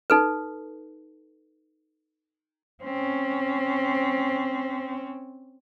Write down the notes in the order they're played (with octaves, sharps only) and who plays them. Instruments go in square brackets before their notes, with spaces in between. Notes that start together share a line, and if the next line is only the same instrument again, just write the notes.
[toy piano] D#4 A4 B4
[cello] C4 C#4